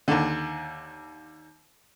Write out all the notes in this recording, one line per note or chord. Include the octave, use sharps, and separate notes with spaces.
D#2 D3